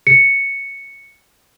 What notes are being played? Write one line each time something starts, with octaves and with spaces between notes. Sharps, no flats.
C#7